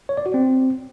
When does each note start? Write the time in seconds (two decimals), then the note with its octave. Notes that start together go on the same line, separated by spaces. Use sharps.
0.09 C#5
0.17 D5
0.26 F#4
0.34 C4